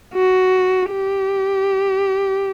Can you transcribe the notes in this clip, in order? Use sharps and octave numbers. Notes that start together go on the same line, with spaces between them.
F#4
G4